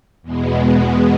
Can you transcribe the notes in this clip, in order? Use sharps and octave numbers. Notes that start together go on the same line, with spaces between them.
E2 B2 G#3 B3